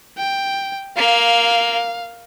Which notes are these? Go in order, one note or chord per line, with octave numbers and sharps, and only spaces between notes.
G5
A#3 F5